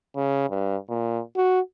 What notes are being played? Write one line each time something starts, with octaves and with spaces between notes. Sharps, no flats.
C#3
G2
A#2
F#4